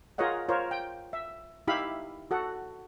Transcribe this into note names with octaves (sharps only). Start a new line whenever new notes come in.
F4 G#4 A#4 C#5 D#5 F#5
F4 A#4 C5 C#5
G5
E5
D#4 E4 G4 E5 F5 B5
F#4 A4 F#5